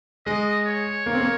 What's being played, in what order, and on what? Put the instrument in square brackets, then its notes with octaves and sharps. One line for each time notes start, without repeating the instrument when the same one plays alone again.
[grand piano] G#3 [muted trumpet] D#5
[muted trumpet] C#5
[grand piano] A#3
C4
A#3